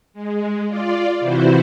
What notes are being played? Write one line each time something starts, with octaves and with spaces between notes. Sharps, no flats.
G#3
F4 D5
C3 E3 E4 F#4 C5